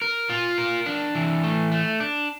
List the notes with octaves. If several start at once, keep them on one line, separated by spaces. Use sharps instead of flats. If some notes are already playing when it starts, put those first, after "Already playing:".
A#4
F4
A#4
D4
E3
A3
A3
D4